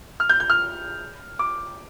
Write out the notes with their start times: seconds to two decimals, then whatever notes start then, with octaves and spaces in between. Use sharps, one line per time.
0.20 F6
0.29 G6
0.40 G6
0.50 F6
1.39 D6